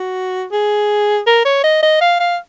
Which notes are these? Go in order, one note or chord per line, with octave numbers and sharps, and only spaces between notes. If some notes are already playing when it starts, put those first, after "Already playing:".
Already playing: F#4
G#4
A#4
C#5
D#5
D#5
F5
F5